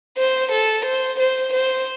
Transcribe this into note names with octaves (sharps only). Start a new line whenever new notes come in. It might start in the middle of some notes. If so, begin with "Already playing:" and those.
C5
A4
C5
C5
C5